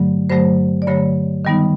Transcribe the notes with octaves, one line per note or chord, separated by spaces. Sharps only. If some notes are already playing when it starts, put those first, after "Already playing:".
Already playing: G2 D3 F#3 A3
G2 D3 F#3 A3 C5
D5
G2 D3 F#3 A3 C#5
D#3 G3 B3 D#4